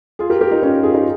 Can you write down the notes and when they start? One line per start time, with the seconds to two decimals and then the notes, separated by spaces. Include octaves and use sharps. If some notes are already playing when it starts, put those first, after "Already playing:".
0.19 F4 G#4
0.30 G4 A#4
0.41 G4 A#4
0.51 D#4 G4
0.63 C#4 F4
0.83 F4 G#4
0.94 D#4 G4